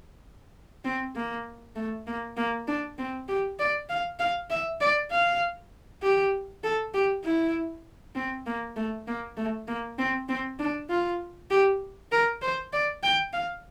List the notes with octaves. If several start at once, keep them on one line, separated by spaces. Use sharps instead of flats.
C4
A#3
A3
A#3
A#3
D4
C4
G4
D5
F5
F5
E5
D5
F5
G4
A4
G4
E4
C4
A#3
A3
A#3
A3
A#3
C4
C4
D4
F4
G4
A#4
C5
D5
G5
F5